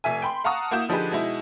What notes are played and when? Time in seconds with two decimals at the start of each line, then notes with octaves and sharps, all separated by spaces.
0.04 F1 A3 E5 G#5
0.22 G5 B5 C6
0.44 F5 F#5 A5 A#5 C#6 D#6
0.71 A#3 E4 F#4 G6 E7
0.89 D3 F3 D#4 G4 G#4 B4
1.12 B2 G#3 D#4 E4